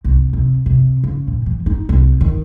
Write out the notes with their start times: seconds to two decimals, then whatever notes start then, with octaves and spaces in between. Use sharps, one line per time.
0.04 C2
0.33 C3
0.66 C3
1.04 C#3
1.28 A#2
1.46 E3
1.66 D#4
1.89 C2
2.21 D#3